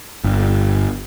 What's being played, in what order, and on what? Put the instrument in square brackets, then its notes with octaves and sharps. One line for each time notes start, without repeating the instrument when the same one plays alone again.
[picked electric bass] G1